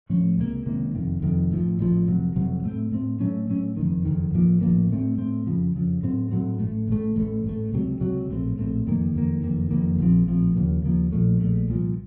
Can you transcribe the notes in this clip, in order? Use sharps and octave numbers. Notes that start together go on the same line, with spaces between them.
A2 F3 A3 C#4
C#2 C3 D#3 A#3
C#2 C3 D#3 A#3
F1 F2 C3 D#3
F1 F2 C3 D#3
A1 A2 F3
A1 A2 F3
F1 F2 C3 F#3
F1 F2 C3 F#3
A2 A3 C4
A2 A3 C4
A2 F#3 A3 C#4
A2 F#3 A3 C#4
F#1 F2 D#3
F#1 F2 D#3
A1 A2 F3 A#3
A1 A2 F3 A#3
A2 A3 C4
A2 A3 C4
F2 C#3 F3
F2 C#3 F3
A2 F#3 C4
A2 F#3 C4
A1 A2 A3
A1 A2 A3
A1 A2 A3
A1 A2 A3
C#2 C3 F#3
C#2 C3 F#3
A#1 A2 A3 C4
A#1 A2 A3 C4
F#1 F2 D#3 A#3
F#1 F2 D#3 A#3
F#1 F2 D#3 A#3
F#1 F2 D#3 A#3
A#1 A2 F3 C4
A#1 A2 F3 C4
D#2 C#3 F3 A#3
D#2 C#3 F3 A#3
A#1 A#2 F3 A3
A#1 A#2 F3 A3
C2 A#2 F3